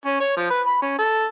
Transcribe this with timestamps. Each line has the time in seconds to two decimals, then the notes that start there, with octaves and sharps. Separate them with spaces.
0.05 C#4
0.20 C#5
0.37 F3
0.50 B4
0.66 B5
0.82 C#4
0.98 A4